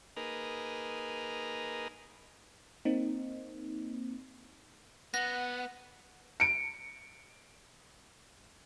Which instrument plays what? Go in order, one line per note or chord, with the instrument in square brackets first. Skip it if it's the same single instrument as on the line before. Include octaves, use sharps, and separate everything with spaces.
[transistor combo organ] A#3 D#4 G#4 A#4 B4
[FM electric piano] A#3 C4 D#4
[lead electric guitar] B3 [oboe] F#5 [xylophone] A#6
[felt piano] C#7 D7